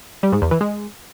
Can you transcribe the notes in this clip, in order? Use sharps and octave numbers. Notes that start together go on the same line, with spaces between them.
G3
G#2
E2
E3
G#3